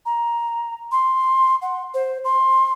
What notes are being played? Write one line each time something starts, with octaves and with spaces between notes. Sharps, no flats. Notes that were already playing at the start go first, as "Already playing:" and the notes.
A#5
C6
F#5
C5
C6